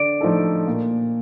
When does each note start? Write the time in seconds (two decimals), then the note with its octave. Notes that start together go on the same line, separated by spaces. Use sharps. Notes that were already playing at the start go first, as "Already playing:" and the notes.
Already playing: D3 D5
0.21 F3 A3 D#4 A4
0.67 A#2